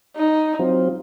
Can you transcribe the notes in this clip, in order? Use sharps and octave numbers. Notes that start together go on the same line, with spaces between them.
D#4
F#3 C4 F4